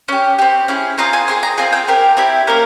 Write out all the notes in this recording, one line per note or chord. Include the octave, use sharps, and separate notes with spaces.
C#4 G4
C4 G4
C#4 E4 G#4
C4 F4 G#4 A#5
G#5
C4 E4 G#4 C6
A#5
C4 F4 G#4 G#5
G5
C4 G4 A#4
C4 E4 G4
A#3 C#4 G4 A#4